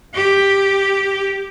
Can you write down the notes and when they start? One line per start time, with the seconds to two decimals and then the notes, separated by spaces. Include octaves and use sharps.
0.15 G4